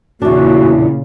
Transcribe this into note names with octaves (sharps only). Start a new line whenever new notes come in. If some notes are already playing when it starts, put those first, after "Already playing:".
E2 A#2 C#3 D4 F#4